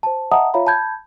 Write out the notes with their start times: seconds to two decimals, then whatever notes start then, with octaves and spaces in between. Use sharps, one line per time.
0.03 C5 A5
0.31 D#5 E5 F#5 A5 A#5 D#6
0.54 F4 C#5 E5 F5 A#5 B5
0.67 A5 B5 G6 G#6